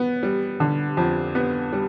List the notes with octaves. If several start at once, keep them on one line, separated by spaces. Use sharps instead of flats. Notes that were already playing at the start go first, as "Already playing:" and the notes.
Already playing: B3
G3
D3
F2
B3
G3